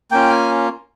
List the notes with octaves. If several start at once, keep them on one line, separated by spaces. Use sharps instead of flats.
A#3 C#4 F4 G5
G#5